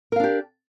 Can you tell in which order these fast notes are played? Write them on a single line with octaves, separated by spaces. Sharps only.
A#4 F5 D4 G4